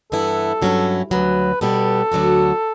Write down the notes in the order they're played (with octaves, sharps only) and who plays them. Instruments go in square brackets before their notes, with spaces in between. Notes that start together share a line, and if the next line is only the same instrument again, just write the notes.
[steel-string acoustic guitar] G2 E3 B3 E4 [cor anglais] A4
[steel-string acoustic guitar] G2 F#3 C#4 E4
[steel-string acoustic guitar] D2 C#3 F#3 [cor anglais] B4
[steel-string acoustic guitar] B2 G3 B3 [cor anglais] A4
[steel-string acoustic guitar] D2 D3 F#3 B3 F#4